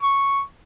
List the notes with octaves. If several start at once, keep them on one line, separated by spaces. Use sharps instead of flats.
C#6